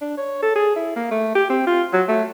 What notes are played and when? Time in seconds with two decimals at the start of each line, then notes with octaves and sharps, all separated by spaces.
0.01 D4
0.17 C#5
0.42 A4
0.55 G#4
0.76 E4
0.96 A#3
1.11 A3
1.35 G4
1.50 C4
1.67 F4
1.93 F#3
2.08 A3